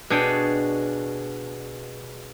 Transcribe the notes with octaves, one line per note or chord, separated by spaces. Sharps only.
B2 D4 G#4 C#5 G5